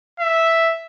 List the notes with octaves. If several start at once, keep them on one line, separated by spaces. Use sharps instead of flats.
E5